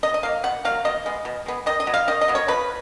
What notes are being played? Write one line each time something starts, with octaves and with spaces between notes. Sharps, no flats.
B2 D#5
D#5
F#3 A#3 F5
B2 F#5
F#3 A#3 F5
B2 D#5
G#3 B3
B2
G#3 B3
D#3 D#5
D#5
F#3 B3
F5
D#3 D#5
D#5
F#3 B3
C#5
F3 B4